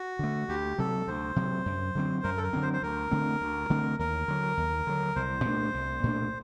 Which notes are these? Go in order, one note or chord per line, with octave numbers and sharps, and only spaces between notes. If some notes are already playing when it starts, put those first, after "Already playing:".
Already playing: F#4
D3 A3
D2 G4
C3 F#3 A4
D2 C5
C3 F#3
F#2
D3 F#3 C4
F#2 A#4
A4
A#4
D3 F#3 C4
C5
C5
D2 A#4
D3 A3 C4
D2
D3 A3 C4
D#2 A#4
D3 F#3
D#2
D3 F#3
C2 C5
A#2 A3 D4
C2
A#2 A3 D4